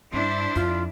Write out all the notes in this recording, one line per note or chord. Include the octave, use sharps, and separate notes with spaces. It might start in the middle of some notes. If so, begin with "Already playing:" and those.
G2 D4 E4 C5
F2 F4